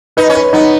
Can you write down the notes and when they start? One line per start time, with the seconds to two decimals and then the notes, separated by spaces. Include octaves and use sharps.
0.17 D#4 B4
0.30 C#4
0.35 B4
0.53 B3 D#4